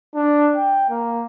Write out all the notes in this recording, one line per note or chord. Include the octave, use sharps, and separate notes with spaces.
D4
G5
A#3